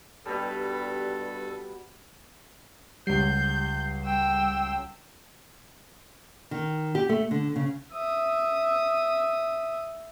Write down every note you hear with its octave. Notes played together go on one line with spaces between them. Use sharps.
G2 B2 G3 A4
C#2 F#3 G3 G6 C7
G5 E6
D#3
G4
A3
D3
C#3
E5 D#6